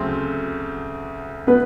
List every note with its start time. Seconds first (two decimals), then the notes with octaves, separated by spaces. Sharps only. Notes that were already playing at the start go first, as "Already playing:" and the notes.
Already playing: D2 C#3 F#3 A3 C4
1.47 B3 B4